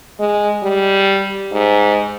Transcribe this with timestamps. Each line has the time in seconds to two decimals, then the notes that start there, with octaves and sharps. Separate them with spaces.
0.20 G#3
0.63 G3
1.52 G#2